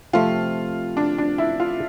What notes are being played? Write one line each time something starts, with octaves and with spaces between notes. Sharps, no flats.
C3 F3 A3 C4 F4
D4
D4
E4
F4